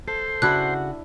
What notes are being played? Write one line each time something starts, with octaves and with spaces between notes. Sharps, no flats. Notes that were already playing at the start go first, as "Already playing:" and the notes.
A4 C5
C#3 D4 E4 F#4 F#5 F#6